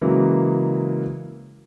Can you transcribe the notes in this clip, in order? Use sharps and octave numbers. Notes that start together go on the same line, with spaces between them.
C#3 E3 F#3 G#3 A#3